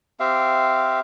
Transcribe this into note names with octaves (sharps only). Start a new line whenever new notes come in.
C4 G4 E5 F5